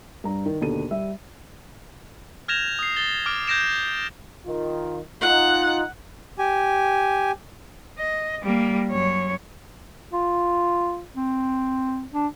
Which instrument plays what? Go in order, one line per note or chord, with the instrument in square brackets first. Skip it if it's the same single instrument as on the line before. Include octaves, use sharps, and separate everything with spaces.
[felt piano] G2 A#5
D#3
D#2 B2 D3 A4 D#7
G3 E5
[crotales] F6 G6 G#6 A#6 E7 F7
D#6 C7
A6 G7
D6 F6 D7
G6 G#6 A#6 D7 E7
[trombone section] D#3 F4
[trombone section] D#4 F4 [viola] F#5
[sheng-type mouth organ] G4 G#5
[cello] D#5
G3 A#3
F#2 C#5
[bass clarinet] F4
C4
D4